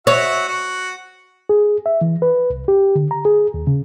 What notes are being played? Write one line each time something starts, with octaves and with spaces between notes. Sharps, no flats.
F#4 C#5 E5
F#4
G#4
E5
E3
B4
C2
G4
D3
A#5
G#4
D#2
C#3